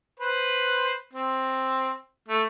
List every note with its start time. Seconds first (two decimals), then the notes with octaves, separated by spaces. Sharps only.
0.20 B4 C5
1.13 C4
2.28 A3